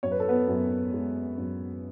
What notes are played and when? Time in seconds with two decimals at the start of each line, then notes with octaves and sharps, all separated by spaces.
0.03 F#2 C#5
0.12 B4
0.20 A4
0.28 B3 B4
0.48 F#2
0.93 G#3
1.38 F#2